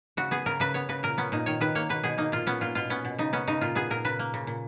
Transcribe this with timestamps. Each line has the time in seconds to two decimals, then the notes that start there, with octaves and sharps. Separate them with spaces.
0.17 C#3 F#4
0.31 B3 G#4
0.46 C#3 A#4
0.60 C#3 B4
0.74 B3 C#5
0.89 C#3 B4
1.03 A#2 A#4
1.18 B3 C#4
1.32 A#2 D#4
1.46 D#3 C#5
1.61 D#3 B4
1.75 A#3 C#5
1.89 B2 B4
2.03 B2 G#4
2.18 A#3 D#4
2.32 A#2 F4
2.47 B3 C#4
2.61 A#2 F4
2.75 B2 F4
2.90 B3 C#4
3.05 B2
3.18 C#3 D#4
3.33 B3 C#4
3.47 C#3 D#4
3.61 A#2 F4
3.75 B3 G#4
3.90 A#2 A#4
4.05 C#3 B4
4.19 A#3
4.34 C#3
4.47 A#2